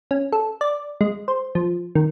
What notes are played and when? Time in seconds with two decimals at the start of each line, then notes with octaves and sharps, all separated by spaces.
0.11 C#4
0.32 A4
0.61 D5
1.01 G#3
1.28 C5
1.55 F3
1.95 D#3